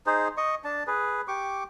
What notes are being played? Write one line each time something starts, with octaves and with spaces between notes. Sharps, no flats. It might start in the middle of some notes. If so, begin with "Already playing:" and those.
D#4 G#4 C5
D#5 C#6
D4 A5
G#4 B4
G4 C#6 D6